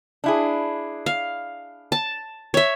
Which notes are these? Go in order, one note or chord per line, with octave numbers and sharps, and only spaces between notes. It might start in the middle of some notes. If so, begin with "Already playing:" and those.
D4 E4 G#4
F5
A5
C#5 E5